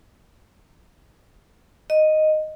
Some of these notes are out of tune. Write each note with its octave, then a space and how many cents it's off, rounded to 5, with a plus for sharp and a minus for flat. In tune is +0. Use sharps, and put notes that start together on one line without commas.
D#5 -5